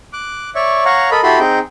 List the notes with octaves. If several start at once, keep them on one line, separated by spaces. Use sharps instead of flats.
D6 F#6
C#5 D5 E5 C#6
C#5 F5 F#5 A#5 C#6
A4 A#4 D#5 B5
E4 F#4 G4 A4 B5 C6
C4 D#4 G#4 G5